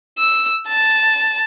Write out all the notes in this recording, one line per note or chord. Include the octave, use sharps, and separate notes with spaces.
E6
A5